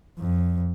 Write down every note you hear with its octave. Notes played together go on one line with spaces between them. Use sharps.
F2